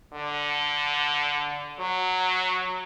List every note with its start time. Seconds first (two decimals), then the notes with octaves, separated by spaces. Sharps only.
0.13 D3
1.80 F#3